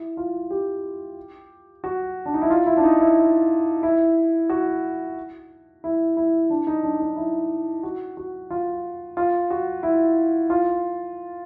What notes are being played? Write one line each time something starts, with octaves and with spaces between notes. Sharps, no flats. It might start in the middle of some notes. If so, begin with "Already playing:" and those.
Already playing: E4
F4
G4
F#4
D4
D#4
E4
F4
E4
D4
D#4
E4
E4
F#4
E4
E4
D4
D#4
D4
D#4
E4
F#4
F#4
F4
F4
F#4
E4
F4